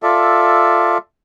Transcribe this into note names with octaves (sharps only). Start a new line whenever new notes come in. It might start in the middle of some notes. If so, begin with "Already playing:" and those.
F4 A4 D5 E5